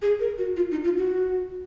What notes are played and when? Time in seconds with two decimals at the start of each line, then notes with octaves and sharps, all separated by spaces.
0.02 G#4
0.20 A#4
0.38 F#4
0.56 F4
0.71 D#4
0.84 F4
0.98 F#4